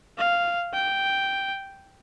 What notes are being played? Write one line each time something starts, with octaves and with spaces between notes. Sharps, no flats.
F5
G5